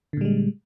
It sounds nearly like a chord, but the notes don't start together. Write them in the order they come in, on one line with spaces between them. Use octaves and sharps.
D3 A#2 G3 G#3